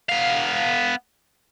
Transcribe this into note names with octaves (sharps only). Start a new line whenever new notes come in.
B3 F5